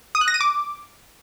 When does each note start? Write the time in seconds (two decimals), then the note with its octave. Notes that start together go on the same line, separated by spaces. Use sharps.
0.15 D#6
0.21 F#6
0.28 A#6
0.34 D#7
0.41 D6